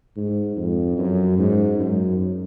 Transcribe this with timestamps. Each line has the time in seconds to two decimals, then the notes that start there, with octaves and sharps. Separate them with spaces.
0.16 G#2
0.57 F2
0.98 F#2
1.38 G#2
1.79 F#2